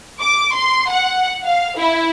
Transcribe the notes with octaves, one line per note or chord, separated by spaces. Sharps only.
D6
C6
F#5
F5
E4